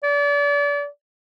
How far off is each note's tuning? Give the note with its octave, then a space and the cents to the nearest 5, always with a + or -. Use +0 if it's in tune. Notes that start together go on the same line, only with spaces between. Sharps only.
D5 -35